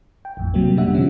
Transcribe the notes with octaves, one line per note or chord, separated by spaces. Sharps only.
G5
A1 F2 A2
C3 F#3 G3 A#3
B2 G3 D4 E5 F#5
B2 D3 D#3 F3 C#4